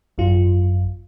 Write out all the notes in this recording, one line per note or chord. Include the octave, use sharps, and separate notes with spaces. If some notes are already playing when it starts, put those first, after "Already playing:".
G#1 F#2 F4